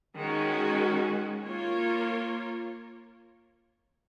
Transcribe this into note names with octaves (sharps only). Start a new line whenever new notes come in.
D#3 G#3 C#4 F#4
A#3 F4 A#4 C#5